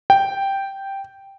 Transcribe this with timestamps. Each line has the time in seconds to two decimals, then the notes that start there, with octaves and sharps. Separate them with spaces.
0.10 G5